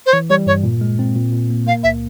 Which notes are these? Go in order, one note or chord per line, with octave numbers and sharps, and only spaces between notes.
C5
E3 C#5
G3 C#5
G2 C#5
A#2
G#3
C4
A#2
A#2
A#3
A#3 F5
C#2 E5